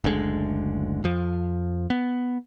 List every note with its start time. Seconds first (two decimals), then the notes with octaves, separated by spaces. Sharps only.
0.04 F#1 D2 D3 G#3
1.04 F2 F3
1.90 B3